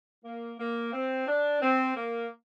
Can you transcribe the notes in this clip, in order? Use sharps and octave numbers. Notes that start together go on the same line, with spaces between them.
A#3
A#3
C4
D4
C4
A#3